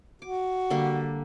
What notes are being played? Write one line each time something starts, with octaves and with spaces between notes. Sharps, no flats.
F#4 D6
D3 G3 A#3